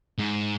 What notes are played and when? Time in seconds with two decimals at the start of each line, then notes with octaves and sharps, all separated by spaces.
0.18 G#2